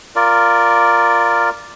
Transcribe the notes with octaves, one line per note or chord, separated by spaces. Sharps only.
F4 A#4 D5